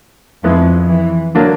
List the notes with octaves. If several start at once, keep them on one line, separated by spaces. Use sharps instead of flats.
F2 D#3 F3 G#3 B3 E4
E3
D3 F#3 A#3 D4